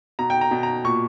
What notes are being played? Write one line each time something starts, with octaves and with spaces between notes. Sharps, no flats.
B2 A#5
G5
A#5
B2
A#5
A#2 C#6